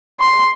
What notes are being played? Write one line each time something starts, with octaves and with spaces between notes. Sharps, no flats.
C6